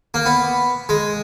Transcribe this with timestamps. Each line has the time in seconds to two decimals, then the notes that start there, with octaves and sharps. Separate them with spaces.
0.14 A#3
0.26 B3
0.89 G#3